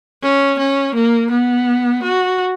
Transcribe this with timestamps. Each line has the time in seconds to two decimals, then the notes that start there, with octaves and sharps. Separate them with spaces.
0.22 C#4
0.58 C#4
0.94 A#3
1.30 B3
2.02 F#4